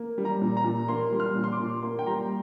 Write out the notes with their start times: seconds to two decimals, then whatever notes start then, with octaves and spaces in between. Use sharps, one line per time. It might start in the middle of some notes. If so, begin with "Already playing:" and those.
Already playing: A#3
0.18 G3
0.25 A#5
0.41 A#2
0.57 A#5
0.64 A#2
0.88 A#3 C6
1.12 G3
1.20 F6
1.35 A#2
1.44 C6
1.52 D6
1.60 A#2
1.83 A#3 C6
1.99 G5
2.07 G3 A#5